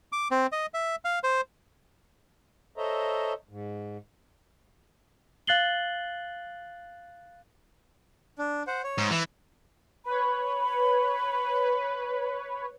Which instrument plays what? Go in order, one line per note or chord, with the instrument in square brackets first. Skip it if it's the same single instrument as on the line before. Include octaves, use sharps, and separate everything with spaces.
[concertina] D6
C4
D#5
E5
F5
C5
[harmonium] A4 C5 C#5 D#5 E5 A#5
G#2
[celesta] F5 F#6 A6 C7 F#7 G7
[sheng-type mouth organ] D4
C5 F#5
C#5
[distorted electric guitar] G#2
E3
[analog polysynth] B4 C#5 [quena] B5